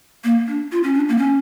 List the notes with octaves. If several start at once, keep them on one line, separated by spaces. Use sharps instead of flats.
A#3
D4
F4
C#4
D4
A#3
C#4